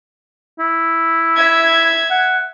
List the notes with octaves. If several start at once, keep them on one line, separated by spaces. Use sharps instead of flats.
E4
E5 G#6
F#5